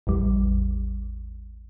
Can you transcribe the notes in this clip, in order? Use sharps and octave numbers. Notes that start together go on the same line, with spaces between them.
A1 E2 G3